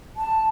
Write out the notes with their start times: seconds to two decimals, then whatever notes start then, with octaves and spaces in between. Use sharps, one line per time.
0.17 A5